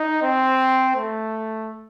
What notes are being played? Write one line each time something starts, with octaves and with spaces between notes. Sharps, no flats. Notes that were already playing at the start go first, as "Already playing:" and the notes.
Already playing: D#4
C4
A3